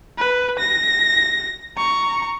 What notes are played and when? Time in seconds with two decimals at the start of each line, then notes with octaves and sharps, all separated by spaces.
0.18 B4
0.59 A#6
1.77 A#5 C#6